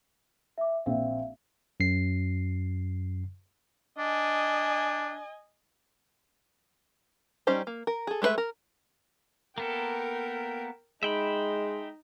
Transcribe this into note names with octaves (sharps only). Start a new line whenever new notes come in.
E5 D6
A#1 C4 E5 F5
F#2 C7
D4 D#5 G#5
G3 C#4 D#4 G4 C5
A#3
A#4
G#4 A4
G#3 A3 E4 B4 E5
A#4
A#3 B3 A4 A#4 G5
G#3 D#4 E5 G5 B5